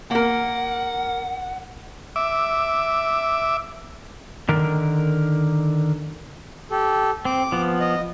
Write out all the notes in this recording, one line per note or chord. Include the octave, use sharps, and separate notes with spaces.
A#3 A#4 F#5
E5 D6
D3 D#3 A#4
G4 A4
C4 D6
F3 B3
D#5